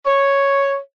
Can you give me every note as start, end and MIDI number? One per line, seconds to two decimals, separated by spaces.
0.06 0.77 73